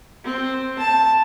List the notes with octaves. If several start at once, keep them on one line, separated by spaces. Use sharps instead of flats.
C4
A5